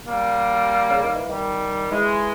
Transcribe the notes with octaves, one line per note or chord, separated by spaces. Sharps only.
G3 A#3
C#3
D#3
E3
D#3 G3
E3 G#3